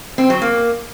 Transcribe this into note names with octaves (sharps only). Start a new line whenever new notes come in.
C4
F#3
A#3